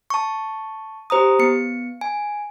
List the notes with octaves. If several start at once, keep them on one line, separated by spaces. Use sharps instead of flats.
A5 C#6
G4 C5 A#5 D#6
B3 C#7
G#5